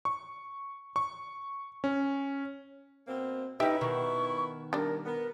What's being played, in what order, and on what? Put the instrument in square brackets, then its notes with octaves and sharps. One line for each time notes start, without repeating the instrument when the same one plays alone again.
[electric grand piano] C#6
C#6
C#4
[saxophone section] B2 A#3 C4
[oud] C#4 G4 [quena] D#4 [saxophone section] E4 B4 [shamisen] E5
[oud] B2 D#3 [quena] C#6
[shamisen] G3 D4 [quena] A#4
[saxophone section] B3 [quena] A#4